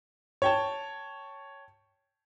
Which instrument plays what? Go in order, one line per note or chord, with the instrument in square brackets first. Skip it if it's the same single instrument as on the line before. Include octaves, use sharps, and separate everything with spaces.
[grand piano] C#5 G5 A5